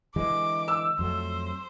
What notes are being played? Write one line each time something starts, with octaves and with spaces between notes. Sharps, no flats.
D3 E3 G#3 D6
E6
F2 F#3 A3 C5